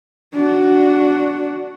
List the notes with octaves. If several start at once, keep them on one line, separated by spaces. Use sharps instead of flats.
D4 F#4